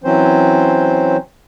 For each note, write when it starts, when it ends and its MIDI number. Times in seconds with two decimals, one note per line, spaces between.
0.04 1.17 52
0.04 1.17 54
0.04 1.17 60
0.04 1.17 61
0.04 1.17 72